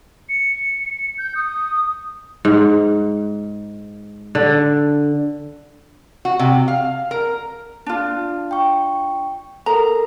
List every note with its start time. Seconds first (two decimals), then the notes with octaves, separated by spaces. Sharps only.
0.29 C#7
1.18 G6
1.35 D#6
2.45 G#2
4.35 D3
6.25 F#4
6.39 C3
6.68 F5
7.11 A#4
7.86 D4 F4
8.51 G5 C#6
9.66 A4 A#4 A#5